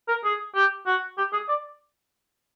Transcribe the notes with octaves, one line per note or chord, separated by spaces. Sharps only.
A#4
G#4
G4
F#4
G4
G#4
D5